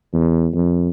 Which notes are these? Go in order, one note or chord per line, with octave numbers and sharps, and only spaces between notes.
E2
F2